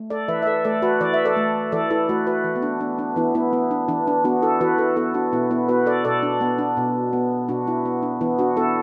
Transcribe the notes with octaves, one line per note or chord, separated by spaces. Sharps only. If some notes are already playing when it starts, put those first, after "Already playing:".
Already playing: A3
A4 D5
E3 B4 E5
E5
A4 D5
A3 A4 D5
F#4 B4
E3 D5
E5
A4 D5
A3
E3 A4 D5
E4 A4
A3 F#4 B4
F#4 B4
E3
B3
D4
B3 D4
D4
E3 B3 E4
B3 E4
B3
D4
E3 D4
D4
B3 D4 F#4
E4 A4
E3 F#4 B4
E4 A4
B3 E4 A4
D4 F#4
B2 B3 E4
B3 E4
B3 F#4 B4
A4 D5
B2 A4 D5
D4
B3
D4
B2
B3
B2 D4 F#4
B3 E4
B3
D4
E3 B3 E4
D4 F#4
B3 E4 A4